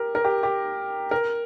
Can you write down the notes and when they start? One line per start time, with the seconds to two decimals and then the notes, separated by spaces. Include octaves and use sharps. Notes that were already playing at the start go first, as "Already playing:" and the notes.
Already playing: G4 A#4
0.15 A#4
0.25 G4
0.43 G4
1.11 A#4